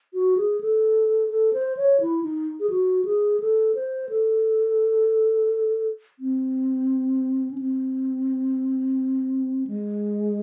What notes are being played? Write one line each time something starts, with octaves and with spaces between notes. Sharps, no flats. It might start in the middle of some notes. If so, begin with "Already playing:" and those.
F#4
G#4
A4
A4
C5
C#5
E4
D#4
G#4
F#4
G#4
A4
C5
A4
C4
C#4
C4
G#3